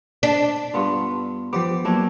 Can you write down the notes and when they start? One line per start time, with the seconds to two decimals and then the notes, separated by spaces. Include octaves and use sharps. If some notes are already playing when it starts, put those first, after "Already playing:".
0.23 D4
0.74 G2 B3 F4
1.53 F3 B3 G4 C5 D6
1.85 F#3 A#3 D4 E4 C#5